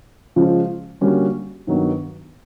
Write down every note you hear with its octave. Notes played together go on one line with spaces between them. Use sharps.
C#3 F3 G#3 C#4 F4
D3 G3 A#3 C#4 F#4
G2 D#3 F#3 B3